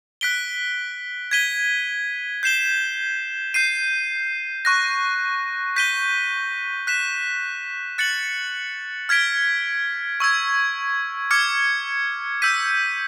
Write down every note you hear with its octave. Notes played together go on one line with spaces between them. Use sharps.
F#6 B6 D7 G7
G#6 B6 D#7 G7
G6 C7 E7 G7
G6 C7 D#7
C#6 F#6 A#6
G6 B6 D#7 G7
F#6 B6 E7
F#6 A6 C#7 F#7
F6 G#6 B6 D7
C#6 E6 G#6
D6 F6 G#6 C#7
E6 G6 B6 D#7